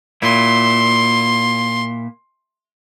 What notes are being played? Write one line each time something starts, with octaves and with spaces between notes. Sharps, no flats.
A#2 E4 C6